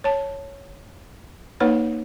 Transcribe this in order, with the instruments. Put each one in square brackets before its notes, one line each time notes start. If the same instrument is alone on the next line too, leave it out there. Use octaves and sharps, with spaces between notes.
[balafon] C#5 A5
A#3 D#4 B4 C#5 F#5